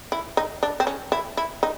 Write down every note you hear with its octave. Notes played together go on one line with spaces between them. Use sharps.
E4
D#4
D4
C4
C#4
E4
E4
D#4